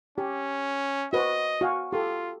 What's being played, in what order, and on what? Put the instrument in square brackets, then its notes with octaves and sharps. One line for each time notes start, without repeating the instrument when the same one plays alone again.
[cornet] C#4 [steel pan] G4
[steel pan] F#4 B4 C5 [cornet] D#5
[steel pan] F#4 F5 G#5
[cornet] F4 [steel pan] G4 A4